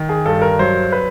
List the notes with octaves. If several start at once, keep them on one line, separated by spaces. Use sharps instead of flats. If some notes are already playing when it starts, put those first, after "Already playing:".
Already playing: D#3
G#4
G2 A4
A#4
F#3 C5
B4